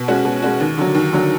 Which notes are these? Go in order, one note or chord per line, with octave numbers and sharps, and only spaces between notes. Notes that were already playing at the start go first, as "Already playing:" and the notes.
Already playing: B2
G#3 C#4 F#4
B2
G#3 C#4 F#4
D#2
D3 F#3
D#2
D3 F#3